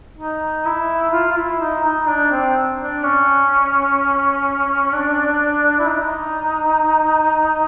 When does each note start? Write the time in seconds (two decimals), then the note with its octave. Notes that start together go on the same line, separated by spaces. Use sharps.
0.18 D#4
0.65 E4
1.13 F4
1.31 F4
1.37 E4
1.60 D#4
1.83 D#4
2.08 D4
2.31 C4
2.79 D4
3.03 C#4
4.93 D4
5.79 E4
5.88 D#4